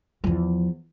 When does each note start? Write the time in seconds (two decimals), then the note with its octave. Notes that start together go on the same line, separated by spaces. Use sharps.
0.24 E2 F3